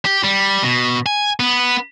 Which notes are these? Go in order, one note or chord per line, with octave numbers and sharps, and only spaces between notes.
G4
G3
B2
G#5
B3